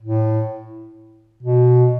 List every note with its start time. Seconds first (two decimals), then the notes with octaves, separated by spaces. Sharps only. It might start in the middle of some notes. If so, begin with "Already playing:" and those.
0.02 A2
1.43 B2